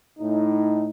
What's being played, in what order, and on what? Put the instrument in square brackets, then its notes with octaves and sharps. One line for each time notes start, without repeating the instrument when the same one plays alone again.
[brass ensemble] A2 D#4